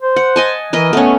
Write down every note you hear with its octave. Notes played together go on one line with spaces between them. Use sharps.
C5
F#5
D#5 G#5 A5
E3 A#4 B4 D#5
A3 B3 C#4